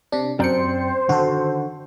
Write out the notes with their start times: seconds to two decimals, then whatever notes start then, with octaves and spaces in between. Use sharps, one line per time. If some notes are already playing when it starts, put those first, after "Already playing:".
0.12 C3 D4
0.40 F#2 C4 C5 D5 G5 A#5 C#7
1.09 D3 D#3 F#4 A4